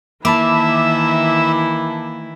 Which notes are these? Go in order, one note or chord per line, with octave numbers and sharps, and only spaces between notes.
D#3 E3 A#3 E4 E5 A5 B5 D6